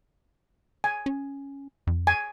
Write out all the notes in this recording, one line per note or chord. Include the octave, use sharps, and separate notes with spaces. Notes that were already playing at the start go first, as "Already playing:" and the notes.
G#5
C#4
F2
G#5